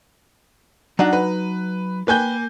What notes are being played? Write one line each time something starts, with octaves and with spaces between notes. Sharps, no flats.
F#3 D4 D#4 F#5
B4
A#3 B4 G5 G#5 G6